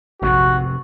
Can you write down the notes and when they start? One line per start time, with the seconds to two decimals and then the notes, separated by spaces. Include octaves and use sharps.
0.22 F1 A#1 G#2 C3 F#4